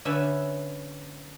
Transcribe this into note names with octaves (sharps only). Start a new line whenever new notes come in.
D3 C#4 B4 E5